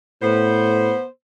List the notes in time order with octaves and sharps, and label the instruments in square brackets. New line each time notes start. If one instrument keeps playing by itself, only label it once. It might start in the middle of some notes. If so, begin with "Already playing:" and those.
[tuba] A2 [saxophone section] B3 C5